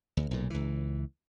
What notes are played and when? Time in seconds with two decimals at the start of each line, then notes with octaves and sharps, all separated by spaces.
0.17 D2
0.31 B1 A#2
0.50 C#2 E3